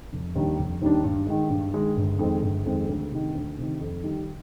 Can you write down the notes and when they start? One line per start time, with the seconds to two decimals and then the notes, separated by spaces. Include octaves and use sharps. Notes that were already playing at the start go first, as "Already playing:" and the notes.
0.13 F1
0.35 D#2 D#3 G3 D4
0.58 F1
0.82 D#2 D#3 G3 D4
1.04 G2
1.27 D#3 G#3
1.50 G2
1.73 D#3 G#3
1.97 G1
2.19 F2 D#3 G#3 C4
2.42 G1
2.66 F2 D#3 G#3 C4
2.89 D2
3.11 C3 D#3
3.35 D2
3.58 C3 D#3
3.81 F2
4.04 D#3 G3